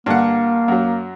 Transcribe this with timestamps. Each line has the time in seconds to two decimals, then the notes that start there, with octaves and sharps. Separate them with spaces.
0.06 G2 D3 A#3 F#5
0.68 F#2 F#3